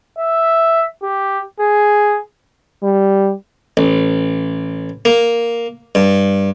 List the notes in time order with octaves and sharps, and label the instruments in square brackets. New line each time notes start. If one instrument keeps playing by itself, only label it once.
[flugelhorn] E5
G4
G#4
[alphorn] G3
[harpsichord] A1
A#3
G2